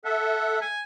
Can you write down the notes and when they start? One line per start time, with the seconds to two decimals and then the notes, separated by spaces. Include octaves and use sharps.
0.05 A4 E5 F#5
0.61 G#5